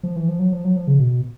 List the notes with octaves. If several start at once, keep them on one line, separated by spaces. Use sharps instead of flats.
F3
E3
F3
F#3
F3
F#3
F3
C#3
B2